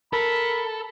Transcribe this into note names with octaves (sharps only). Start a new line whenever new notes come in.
A4 A#4 B5